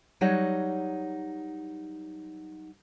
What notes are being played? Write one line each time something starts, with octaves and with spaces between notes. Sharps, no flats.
F#3 G3 D#4 C#5 F#5